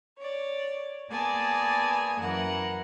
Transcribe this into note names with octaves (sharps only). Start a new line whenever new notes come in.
C#5 D5
A#3 B3 G#4 D5 G#5 A5
F#2 E3 A#4 F#5